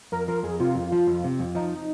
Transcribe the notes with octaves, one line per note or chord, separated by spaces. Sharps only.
F2 A#4
F3 A#4
F2 G#4
C3 F4
F2
F3
F2
C3
F2
F3 D#4